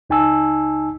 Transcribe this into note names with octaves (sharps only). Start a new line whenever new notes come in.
C#2 D#4 G#5 A5 E6